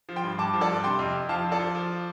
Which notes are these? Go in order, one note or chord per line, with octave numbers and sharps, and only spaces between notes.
F3
G5 C6
G2
G2 A5 D6
F3
A4 D5
G2
D6
C3 G5 C6
F2
F2
F3 F5 A5
F3
A4 D5
F3
F3